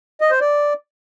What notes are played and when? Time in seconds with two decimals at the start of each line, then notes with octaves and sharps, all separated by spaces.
0.21 D#5
0.31 C5
0.41 D5